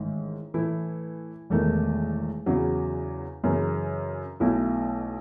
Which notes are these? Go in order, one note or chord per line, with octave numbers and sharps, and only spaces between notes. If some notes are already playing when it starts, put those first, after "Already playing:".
Already playing: A1 G#2 D#3
A2 E3 A3 E4
E1 E2 D#3 A3
E2 C#3 F#3 C#4
F#2 C#3 E3
B1 B2 A3 E4